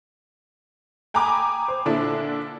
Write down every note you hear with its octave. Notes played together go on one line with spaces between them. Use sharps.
G5 G#5 A#5 B5 D6 D#6
C5
A#2 D3 D4 E4